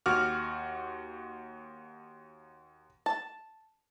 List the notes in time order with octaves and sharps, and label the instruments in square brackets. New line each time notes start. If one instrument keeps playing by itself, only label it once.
[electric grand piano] D#2 F#4 D6 F6
[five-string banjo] A5